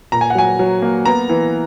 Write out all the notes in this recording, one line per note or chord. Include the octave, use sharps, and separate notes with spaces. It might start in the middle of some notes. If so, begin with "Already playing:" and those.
A#2 A#5
G#5
F#5
F#3 G#5
F#3
A#3
B3 A#5
E3